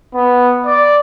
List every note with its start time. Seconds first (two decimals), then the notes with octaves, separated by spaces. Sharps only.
0.13 B3
0.66 D5